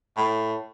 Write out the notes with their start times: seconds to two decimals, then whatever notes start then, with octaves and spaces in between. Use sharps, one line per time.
0.17 A2